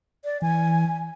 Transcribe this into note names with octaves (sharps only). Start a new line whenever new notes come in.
D5
E3 G#5